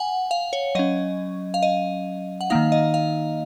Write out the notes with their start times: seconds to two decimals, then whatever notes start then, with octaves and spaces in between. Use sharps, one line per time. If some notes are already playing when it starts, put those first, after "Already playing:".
Already playing: F#5 G#5
0.31 F5
0.53 C#5
0.75 F#3 C#4 D#5
1.54 F5
1.63 D#5
2.41 F#5
2.50 D#3 A#3 D#4 F5
2.72 D#5
2.94 F5